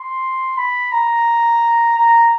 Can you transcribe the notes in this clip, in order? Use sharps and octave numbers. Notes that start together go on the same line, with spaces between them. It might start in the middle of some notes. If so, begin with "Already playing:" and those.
Already playing: C6
B5
A#5
A#5